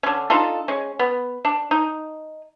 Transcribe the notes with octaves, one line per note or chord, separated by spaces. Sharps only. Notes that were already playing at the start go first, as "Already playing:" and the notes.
D3 C#4
D4 D#4 F4 A4
G#3 C#4
B3
D4
D#4